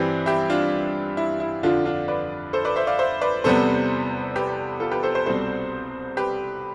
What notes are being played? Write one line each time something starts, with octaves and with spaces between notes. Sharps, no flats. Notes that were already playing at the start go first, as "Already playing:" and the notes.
Already playing: G2 E3 G3 C4 G4 B4
E4 G4
D4 F4
E4
E4
F2 D3 F3 D4 F4
D4 F4
B4 D5
A4 C5
B4 D5
C5 E5
D5 F5
C5 E5
B4 D5
E2 C3 G3 B3 A4 C5
G4 B4
F4 A4
G4 B4
A4 C5
A4 C5
C2 B2 G3 C4 A4 C5
G4 B4